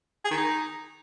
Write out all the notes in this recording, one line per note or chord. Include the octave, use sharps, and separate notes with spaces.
G#4
D#3
D#4